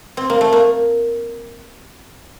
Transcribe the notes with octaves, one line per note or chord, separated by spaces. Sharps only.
C4
A#3
A3
A#3